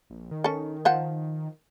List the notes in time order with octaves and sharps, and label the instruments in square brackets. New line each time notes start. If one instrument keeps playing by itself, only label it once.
[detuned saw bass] A#1
D#3
[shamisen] C#4 A4
F3 C5 F#5